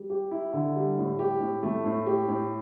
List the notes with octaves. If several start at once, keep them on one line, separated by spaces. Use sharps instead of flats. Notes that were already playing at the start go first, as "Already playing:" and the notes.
Already playing: G3
G4
E4
D3
G3
A2
G4
A2
A3
A2
G4
A2